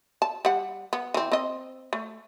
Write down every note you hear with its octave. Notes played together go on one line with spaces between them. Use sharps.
A5
G3 F#5
B3
E3 C4
C4 D#5
A3